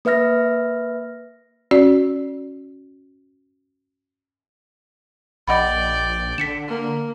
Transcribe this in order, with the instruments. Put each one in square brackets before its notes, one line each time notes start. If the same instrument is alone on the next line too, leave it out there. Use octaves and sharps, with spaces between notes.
[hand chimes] A#3 B4 E5 F6 A#6
[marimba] C#4 F#4 D5
[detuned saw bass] A#1 [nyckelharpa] D5 G5 [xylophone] D#5 F#5 B5
[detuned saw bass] D3 [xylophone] B6 C#7 E7
[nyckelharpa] A#3